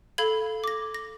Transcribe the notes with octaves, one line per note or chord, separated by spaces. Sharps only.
A4 F5 B5 G#6 F#7
D6 A#6
A#6